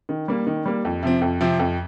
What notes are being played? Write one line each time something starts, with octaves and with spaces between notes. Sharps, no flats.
D#3
G3 A#3
D#3
G3 A#3
F2
C3 F3 C4
F2
C3 F3 C4
F2